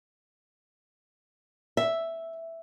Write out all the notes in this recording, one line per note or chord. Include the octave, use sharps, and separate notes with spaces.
E5